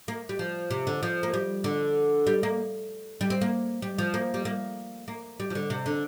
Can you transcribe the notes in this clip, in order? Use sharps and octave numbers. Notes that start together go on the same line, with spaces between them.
A#3
G3
F3
C3
D3
F3
A#3
G3
D3
G3
A#3
G3
C4
A#3
G3
F3
A#3
G3
A#3
A#3
G3
F3
D3
C3
D3